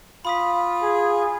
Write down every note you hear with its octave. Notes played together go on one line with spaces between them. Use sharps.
F4 B5 D#6 B6
G#4